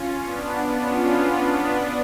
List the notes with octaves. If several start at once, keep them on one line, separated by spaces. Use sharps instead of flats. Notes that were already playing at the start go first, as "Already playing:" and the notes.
Already playing: C#4 F4
B3 D4
C#4 F4
B3 D4